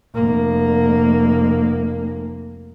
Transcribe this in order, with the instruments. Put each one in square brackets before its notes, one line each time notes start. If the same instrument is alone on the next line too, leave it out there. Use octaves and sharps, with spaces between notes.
[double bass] F1 A#3